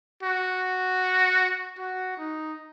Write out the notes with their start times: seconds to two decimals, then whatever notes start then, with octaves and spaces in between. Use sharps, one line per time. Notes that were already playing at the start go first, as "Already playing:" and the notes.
0.23 F#4
1.79 F#4
2.18 D#4